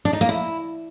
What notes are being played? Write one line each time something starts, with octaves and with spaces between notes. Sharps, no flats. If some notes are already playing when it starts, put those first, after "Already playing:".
D4
D#4
A#3
E4